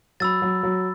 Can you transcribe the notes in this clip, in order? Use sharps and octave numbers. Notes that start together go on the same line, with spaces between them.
F#3 B5 E6 A6
F#3
F#3